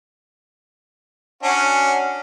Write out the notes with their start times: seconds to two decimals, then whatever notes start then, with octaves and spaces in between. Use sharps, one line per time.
1.43 C#4 D4 F#4